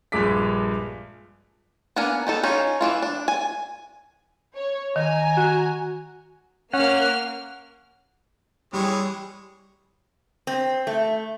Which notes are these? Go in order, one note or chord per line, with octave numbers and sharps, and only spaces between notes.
A#1 G2 G#3 D6 B6
A#3 B3 D4 A#4 G#5
B3 D#4 A4
C#4 D#4 F4
E3 E4 F4
D4
G#5
C#5
D#3 G#5 A#5
F#4
A#3 C#4 F#5 F6 F#6
E3 G3 G#3 C#5
C4
A3